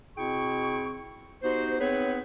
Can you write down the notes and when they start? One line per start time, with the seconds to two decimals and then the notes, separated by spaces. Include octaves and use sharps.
0.17 B2 C4 E4 G#4 G5 C#6
1.43 B3 D#4 F#4 G4 C5
1.80 B3 C4 D#4 G#4 B4 C#5